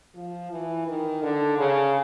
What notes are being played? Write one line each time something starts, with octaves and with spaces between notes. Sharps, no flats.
F3
E3
D#3
D3
C#3